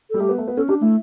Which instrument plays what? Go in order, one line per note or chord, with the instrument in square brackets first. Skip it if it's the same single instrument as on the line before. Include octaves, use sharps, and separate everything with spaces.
[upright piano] G3 [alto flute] A4
[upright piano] A3 [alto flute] G4
[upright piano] B3
A3
B3
[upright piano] C#4 [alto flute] A4
[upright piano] D4 [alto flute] G4
[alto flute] A3 [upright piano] E4